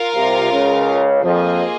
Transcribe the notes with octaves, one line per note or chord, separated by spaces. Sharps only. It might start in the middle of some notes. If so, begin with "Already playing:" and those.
Already playing: F4 A#4 F5
C2 C3
C#2 C#3
F2 F3 A#3 F4 G#4 D#5 G#5